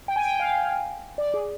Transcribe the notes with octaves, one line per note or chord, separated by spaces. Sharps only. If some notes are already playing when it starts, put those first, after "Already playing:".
G5
G#5
G5
F5
D5
G#4